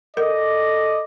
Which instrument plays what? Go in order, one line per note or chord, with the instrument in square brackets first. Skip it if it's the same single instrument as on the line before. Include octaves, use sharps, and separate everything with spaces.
[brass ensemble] A4 D5 D#5 [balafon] A#4